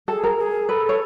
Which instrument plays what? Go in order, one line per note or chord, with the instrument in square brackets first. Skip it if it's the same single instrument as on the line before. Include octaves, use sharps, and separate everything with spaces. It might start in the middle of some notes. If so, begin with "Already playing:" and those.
[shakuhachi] G#4 [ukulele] A4
[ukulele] A#4
[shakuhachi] G#4
[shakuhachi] A4 [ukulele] B4
[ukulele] C#5